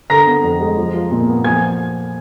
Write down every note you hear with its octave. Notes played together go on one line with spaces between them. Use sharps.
D3 A#5 A#6
B3
F2
G#3
F3
F4
A#2
B3
F3 G#5 G#6